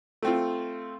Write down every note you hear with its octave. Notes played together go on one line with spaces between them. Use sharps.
A3 C4 F4